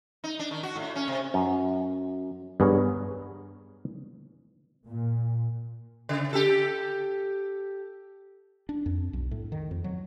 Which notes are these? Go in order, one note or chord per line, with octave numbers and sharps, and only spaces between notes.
D#4
D4
D#3
F#4
A2
C#4
C3
F#2
G2 B3 G#4 A#4 C#5
A#2
C#3
G4 A4
D4
F2
B1
A2
D#3
F2
F#3